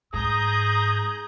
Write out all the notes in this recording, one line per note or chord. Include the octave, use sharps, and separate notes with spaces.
G#2 G#4 A#5 D#6 G6